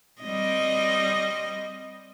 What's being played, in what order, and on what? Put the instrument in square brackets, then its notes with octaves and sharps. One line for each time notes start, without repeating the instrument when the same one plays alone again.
[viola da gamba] G3 C4 D#5